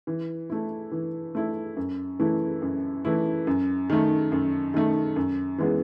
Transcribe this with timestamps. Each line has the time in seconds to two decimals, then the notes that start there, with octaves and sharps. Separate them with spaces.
0.07 E3
0.50 A3 E4
0.92 E3
1.35 A3 E4
1.76 F#2
2.20 E3 A3 E4
2.62 F#2
3.05 E3 A3 E4
3.47 F#2
3.90 D#3 A3
4.32 F#2
4.74 D#3 A3
5.16 F#2
5.58 E3 G#3 B3